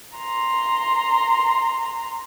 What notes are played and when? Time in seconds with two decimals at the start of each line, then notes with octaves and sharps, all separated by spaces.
0.17 A#5 C6